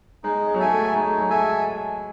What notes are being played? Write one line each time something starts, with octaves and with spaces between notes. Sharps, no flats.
G#3 D#4
G#3
F#3
G#3 A4 E5 G#5
A3
G#3 D#4
F#3
G#3 A4 E5 G#5